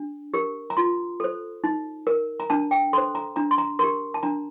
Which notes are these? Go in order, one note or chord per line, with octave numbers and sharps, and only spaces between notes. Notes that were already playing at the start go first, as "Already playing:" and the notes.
Already playing: D4
G4 A#4
A#5
F4 C6
A4 C5
D#4
A#4
A#5
D4 A5
G5
A4 C5 C6
A#5
D4 A#5
C6
A#5
G4 A#4 C6
A5
D4 A#5